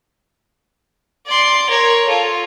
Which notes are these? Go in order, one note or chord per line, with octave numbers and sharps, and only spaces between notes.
D5 C6
A#4 C#5
F4 A4